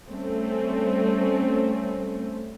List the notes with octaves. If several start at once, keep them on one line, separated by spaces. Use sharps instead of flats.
G3 A3 C4 C#4